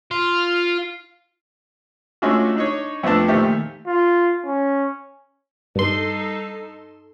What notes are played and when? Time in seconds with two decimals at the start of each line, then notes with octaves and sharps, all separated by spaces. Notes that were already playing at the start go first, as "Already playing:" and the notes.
0.11 F4
2.22 G#3 A3 C#4 D4 F4 F#4
2.56 D4 D#4 C#5
3.03 F2 A3 B3 D4 A5
3.28 A#2 D#3 F3 A3 G4
3.86 F4
4.45 C#4
5.76 G2 D#4 A4 C6